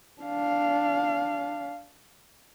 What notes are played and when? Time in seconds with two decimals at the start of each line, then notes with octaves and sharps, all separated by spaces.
0.22 D4 F5